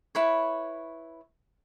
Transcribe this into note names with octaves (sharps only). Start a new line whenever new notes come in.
E4 B4 C#5